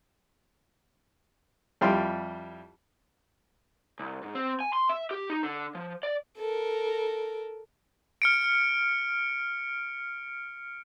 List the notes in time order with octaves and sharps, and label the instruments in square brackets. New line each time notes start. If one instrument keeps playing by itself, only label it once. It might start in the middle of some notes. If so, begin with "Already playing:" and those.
[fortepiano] F2 G3 E4 F5 G5 C6
[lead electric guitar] C2
G#2
C4
G#5
C6
E5
G4
D#4
D3
F3
D5
[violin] A4 A#4
[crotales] F6 C#7 D7